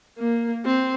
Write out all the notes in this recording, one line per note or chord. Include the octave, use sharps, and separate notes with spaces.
A#3
C4